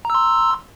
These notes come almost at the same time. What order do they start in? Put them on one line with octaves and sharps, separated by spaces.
A#5 E6 C6